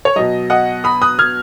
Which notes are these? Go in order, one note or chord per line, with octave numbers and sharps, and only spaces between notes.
C#5
B2 F#3 D#5
D#5 F#5
B5 D#6
D#6 F#6
F6 G#6